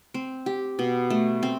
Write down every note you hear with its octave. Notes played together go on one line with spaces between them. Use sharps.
C4
G4
B2
A3
C4